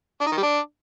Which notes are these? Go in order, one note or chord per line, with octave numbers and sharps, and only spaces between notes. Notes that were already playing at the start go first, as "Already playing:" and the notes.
D4
D#4
D#3
G3
D4